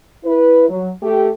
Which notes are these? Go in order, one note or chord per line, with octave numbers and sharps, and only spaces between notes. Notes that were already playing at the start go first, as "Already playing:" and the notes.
E4 B4
F#3
A3 G4